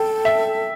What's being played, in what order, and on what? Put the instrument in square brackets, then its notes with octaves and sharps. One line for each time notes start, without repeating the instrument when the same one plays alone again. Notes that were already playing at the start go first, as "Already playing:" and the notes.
Already playing: [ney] A4 [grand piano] G5
[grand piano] E5